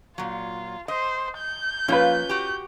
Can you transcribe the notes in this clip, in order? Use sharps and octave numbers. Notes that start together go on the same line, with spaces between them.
A#2 F#3 F4
C5 D#5
G6
F3 A#3 C#4 F4 B4
F#4 G4